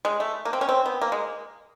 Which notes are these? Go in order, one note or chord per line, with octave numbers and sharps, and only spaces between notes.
G#3
A3
A#3
C4
C#4
C4
B3
A#3
G#3